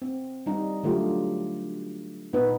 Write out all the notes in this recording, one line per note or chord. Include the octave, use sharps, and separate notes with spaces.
C4
G3 D#4
D3 F#3 A3 F4 G4
A#2 B3 D#4 B4